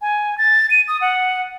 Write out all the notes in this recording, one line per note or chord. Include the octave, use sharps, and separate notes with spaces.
G#5
A6
D#7
D#6
F#5